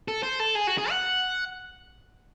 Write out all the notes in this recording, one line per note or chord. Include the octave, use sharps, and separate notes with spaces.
A4
C5
A4
G#4
F#4
G#4
F#5